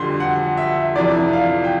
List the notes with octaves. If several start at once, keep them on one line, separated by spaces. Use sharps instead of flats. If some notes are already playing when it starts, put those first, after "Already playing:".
Already playing: F2 D3 G3 C6
F#5
E5
F2 C3 E3 D5
F5
G5